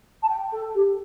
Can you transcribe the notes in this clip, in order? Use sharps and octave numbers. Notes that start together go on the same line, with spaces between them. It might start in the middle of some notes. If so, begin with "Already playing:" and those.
A5
G5
A4
G4